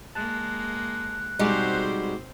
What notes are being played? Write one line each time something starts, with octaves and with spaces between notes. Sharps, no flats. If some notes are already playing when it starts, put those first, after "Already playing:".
G#3 A#3 A5 F#6
B2 G3 G#3 C4 D#4 F#4 C5 D6